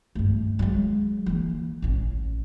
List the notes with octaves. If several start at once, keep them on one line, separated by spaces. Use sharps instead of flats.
G2 A3
F#3 G#3
E3 A#3
A1 C#4